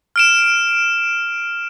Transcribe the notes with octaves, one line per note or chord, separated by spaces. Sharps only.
F6 D7 E7